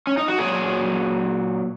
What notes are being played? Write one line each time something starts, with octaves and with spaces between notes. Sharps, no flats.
C#4
D#4
F#4
A#2 F#3 G#4